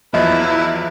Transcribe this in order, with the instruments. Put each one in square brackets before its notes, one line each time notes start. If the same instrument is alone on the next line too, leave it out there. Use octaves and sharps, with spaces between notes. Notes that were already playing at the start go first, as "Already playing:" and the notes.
[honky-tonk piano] E2 F3 F#3 [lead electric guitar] E4 [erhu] B4 [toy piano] D#5